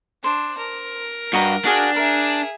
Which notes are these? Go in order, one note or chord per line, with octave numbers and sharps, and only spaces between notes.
D4 C5
A#4
G2 F#4 D#5 A#5
D4 F#4 G#4 F5
G#4 A#4 E5